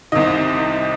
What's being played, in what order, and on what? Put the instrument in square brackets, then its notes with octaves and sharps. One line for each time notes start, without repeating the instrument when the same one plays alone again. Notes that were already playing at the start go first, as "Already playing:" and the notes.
[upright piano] C2 C3 D#3 D#5